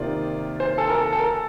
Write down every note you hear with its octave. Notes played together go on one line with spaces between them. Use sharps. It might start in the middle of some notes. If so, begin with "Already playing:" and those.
Already playing: C3 D#3 A#3 F4 D5
C5
A4
A#4
A4
A4
A#4
A4